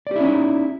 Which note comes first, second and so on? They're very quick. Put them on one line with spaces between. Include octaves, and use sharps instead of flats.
D5 G4 E4 C#4 D#4